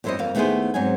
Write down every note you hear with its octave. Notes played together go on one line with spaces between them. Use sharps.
F2 G3 E4 C5 C#5 D#5
F2 A#3 F5
D#2 A3 B3 E4 G#4 C5
G#2 F#3 C4 D#4 G#5